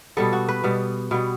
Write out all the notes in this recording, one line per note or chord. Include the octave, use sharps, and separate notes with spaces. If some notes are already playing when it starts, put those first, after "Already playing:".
B2 G3 B3 A4
F#4
B4
B2 G3 B3
B2 G3 B3